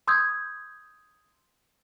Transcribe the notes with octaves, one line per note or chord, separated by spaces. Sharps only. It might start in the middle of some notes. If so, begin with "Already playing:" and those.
C6 D#6 E6 G6 G#6